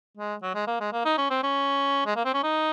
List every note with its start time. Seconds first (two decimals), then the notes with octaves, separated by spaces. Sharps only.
0.17 G#3
0.42 F#3
0.55 G#3
0.67 A#3
0.80 G#3
0.92 A#3
1.05 D#4
1.18 C#4
1.30 C4
1.43 C#4
2.06 G#3
2.16 A#3
2.25 C4
2.34 C#4
2.43 D#4